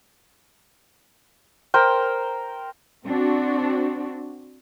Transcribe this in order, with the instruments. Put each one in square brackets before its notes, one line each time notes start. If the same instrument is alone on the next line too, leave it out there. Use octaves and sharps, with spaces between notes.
[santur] A#4 C5 G5
[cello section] C4 D4 F#4